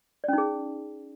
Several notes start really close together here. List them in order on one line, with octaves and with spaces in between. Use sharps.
D5 C#4 D#4 G#4